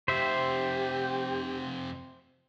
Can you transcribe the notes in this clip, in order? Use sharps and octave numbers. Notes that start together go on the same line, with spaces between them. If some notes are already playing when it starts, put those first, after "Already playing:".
F2 C3 G4 C5 E5